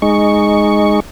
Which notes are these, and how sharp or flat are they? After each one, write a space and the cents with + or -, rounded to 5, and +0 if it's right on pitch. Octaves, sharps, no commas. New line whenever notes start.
G#3 +0 D#4 -10 C#6 +5